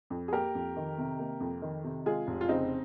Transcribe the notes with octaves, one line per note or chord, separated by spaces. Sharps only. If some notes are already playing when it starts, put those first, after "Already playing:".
F2
G#4
A#3 G4 A#4
F2
D#3
C3
A#3
F2
D#3
C3
G#3 F4 G#4
F1
F4
C#3 C4 D#4